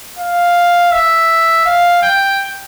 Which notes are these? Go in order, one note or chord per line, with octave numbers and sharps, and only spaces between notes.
F5
E5
F5
G5